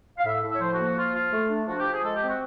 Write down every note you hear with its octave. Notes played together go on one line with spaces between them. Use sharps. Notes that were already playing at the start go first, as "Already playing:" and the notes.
F5
A2 E5
A2
E5
C#5
F3 C5
F#4
A#3
F#4
F3 F4
F4
A3
D4
F3 F#4
G4
F3
G#4
G#3 A4
G4
C4
F#4